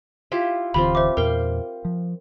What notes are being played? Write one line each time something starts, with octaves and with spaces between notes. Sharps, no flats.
E4 F4 G4
D1 D3 E3 C4 F4 G4 B5
C5 E5 D6
E2 A#2 A#4 F5 G5
F3